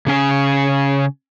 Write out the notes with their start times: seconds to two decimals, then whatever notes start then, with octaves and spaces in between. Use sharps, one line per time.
0.06 C#3 C#4 G#5